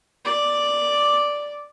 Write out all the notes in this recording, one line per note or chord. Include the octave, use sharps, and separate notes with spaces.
D5 D6